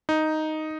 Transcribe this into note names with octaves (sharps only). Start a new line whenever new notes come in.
D#4